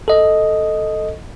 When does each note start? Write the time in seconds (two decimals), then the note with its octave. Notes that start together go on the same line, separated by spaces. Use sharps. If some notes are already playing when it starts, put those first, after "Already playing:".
0.08 A4 D#5